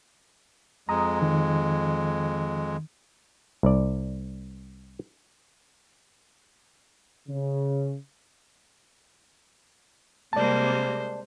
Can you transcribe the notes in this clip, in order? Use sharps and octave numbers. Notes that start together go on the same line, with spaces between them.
F2 G#3 A#5 D#6
D#3
C2 D5
C#3
C3 G3 G#3 A#3 C5 D5 A5